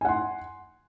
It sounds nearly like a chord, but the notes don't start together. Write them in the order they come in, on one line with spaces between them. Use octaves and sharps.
G#5 F#5 C6